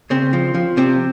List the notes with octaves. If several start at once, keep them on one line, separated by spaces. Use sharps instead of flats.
C#3 C4
F3
F3
C3 C4